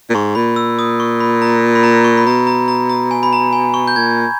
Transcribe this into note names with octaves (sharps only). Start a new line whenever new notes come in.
A#2
G#2 C#6
A#2 B5
E6
D#6
C#6
B5
A#5
B5
A#5
C#6
B5
B2 A#5
A#5
A#5
A#5
G#5
B5
A#5
G#5
C#6
G6
A#2 G#6